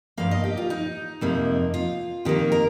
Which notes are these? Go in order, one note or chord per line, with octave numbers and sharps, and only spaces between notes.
G2 F3 A#3 F5
D#5
G4
F4
D#4
F2 C3 F3 A#3
F4
F2 D#3 A#3 G4
A#4